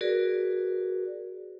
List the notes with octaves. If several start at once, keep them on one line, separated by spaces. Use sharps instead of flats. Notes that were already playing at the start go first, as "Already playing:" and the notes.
F#4 G#4 A#4 B4 D5